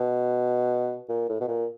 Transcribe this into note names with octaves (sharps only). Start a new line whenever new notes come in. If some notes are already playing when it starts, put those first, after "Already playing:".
Already playing: B2
A#2
A2
B2
A#2